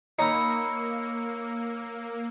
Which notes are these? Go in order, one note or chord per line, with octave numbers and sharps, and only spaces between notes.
A#3 D#4 C#5 G#5 B5 E6 C#7